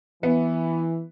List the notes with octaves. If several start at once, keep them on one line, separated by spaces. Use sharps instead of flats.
E3 B3